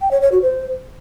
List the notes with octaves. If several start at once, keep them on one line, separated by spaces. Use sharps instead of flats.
G5
C#5
C#5
F#4
C5